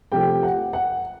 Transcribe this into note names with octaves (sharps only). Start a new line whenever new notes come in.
C3 F3 A3 G4 G5
F#5
F#5